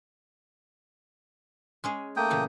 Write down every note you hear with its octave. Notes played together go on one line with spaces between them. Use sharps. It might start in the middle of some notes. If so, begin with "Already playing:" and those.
G#3 C#4 G#4
A3 A#3 G5 D#6
A#2 C#3 E3